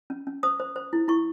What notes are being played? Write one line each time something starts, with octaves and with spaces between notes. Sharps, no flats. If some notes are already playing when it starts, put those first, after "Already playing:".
C#4
C#4
C5 D#6
C5
C5
E4
E4 C#6